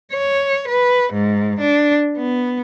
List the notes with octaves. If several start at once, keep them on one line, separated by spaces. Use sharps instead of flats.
C#5
B4
G#2
D4
B3